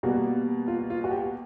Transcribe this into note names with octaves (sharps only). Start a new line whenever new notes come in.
B2 G3 A#3 F#4
F4
F4
F#4
G4